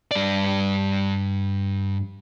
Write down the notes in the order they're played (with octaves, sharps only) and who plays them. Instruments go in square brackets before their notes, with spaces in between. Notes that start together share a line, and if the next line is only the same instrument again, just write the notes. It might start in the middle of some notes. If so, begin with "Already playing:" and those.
[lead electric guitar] G2 D5